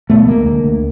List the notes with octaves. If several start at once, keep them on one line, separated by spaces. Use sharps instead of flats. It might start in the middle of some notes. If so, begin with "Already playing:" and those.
B2 A3 B3
D2 G#3 A#3
D3
D2